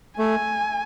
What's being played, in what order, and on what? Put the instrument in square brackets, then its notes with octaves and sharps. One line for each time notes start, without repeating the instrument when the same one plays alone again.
[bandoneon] A3 [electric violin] G#5